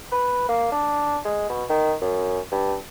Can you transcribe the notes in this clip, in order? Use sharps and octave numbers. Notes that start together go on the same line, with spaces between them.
B4
A#3
D4
G#3
B2
D#3
F#2
G2